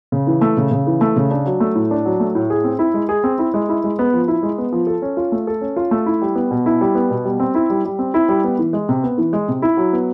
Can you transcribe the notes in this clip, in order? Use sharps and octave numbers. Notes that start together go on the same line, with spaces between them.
C#3
E3
A3
C#3
C#3
E3
A3
C#3
D4
F#3
A3
A2
D4
F#3
A3
A2
G#4
C4
E4
G#3
G#4
C4
E4
G#3
E4
G#3
B3
F3
E4
G#3
B3
F3
A4
C#4
F4
A3
A4
C#4
F4
A3
E4
G3
B3
B2
E4
G3
B3
B2
G3
C4
E4
G3
G3
C4
E4
G3
B3
E3
G#3
C3
B3
E3
G#3
C3
E4
F#3
B3